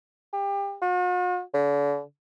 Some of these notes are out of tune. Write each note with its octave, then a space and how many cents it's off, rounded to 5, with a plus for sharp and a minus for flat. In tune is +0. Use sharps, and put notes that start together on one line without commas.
G4 +30
F#4 -45
D3 -40